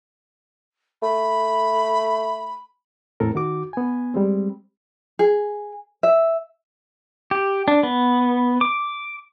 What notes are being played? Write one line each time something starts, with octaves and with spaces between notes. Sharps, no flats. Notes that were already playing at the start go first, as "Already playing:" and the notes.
A3 B5
E2 A2 C4 A4 A#4
D#3 F#4 D6
B3 G#5
G3 G#3 C4
G#4
E5
G4
D4
B3
D6